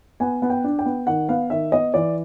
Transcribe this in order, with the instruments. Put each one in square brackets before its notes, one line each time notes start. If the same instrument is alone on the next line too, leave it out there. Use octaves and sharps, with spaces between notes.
[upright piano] B3 G#5
B3
G5
D4
G5
B3
D#3 F#5
B3 F5
D#3 E5
B3 D#5
E3 D5